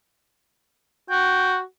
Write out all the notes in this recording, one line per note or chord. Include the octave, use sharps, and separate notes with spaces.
F#4 G5